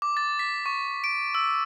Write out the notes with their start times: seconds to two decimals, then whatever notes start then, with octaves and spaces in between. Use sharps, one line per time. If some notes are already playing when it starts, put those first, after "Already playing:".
0.02 D6
0.17 A6
0.39 B6
0.66 C#6
1.04 D7
1.35 E6